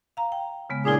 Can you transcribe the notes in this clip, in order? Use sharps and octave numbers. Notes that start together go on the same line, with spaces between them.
F5 A#5
G5
C#3 G#3 B3
A#2 D4 E4 F4 G#4